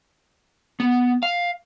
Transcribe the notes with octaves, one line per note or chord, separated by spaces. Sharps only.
B3
F5